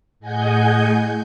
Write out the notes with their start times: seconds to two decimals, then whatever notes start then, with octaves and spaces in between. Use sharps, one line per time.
0.20 A2 G#4 D#5 F#5 G#5 G6